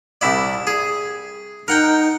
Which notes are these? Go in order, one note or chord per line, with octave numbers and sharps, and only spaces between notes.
C2 E4 D5
G#4
D#4 A#4 F#5 G5